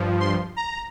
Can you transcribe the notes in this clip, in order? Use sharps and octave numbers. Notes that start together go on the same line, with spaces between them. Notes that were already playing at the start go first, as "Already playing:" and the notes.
Already playing: G2 F3
C6
A#5